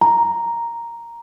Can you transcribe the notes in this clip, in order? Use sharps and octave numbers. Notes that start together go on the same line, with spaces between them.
A#5